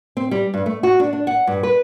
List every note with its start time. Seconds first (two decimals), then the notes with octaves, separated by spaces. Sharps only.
0.17 C4
0.31 G3
0.54 G2
0.66 A3
0.83 F#4
1.00 D4
1.13 D4
1.27 F#5
1.47 G2
1.63 B4